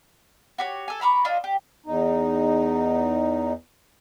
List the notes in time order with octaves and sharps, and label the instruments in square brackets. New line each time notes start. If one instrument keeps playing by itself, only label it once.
[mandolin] F#4 G4 C#5
A4 G#5
A#5 B5 C#6 D6
D4 F4 D#5 A5
G4
[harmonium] E2 D#4